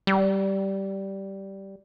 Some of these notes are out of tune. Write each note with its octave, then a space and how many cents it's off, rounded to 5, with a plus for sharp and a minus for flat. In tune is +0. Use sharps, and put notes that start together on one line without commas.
G3 -10